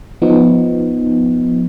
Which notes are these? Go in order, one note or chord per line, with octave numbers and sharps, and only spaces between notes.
F3 B3 D#4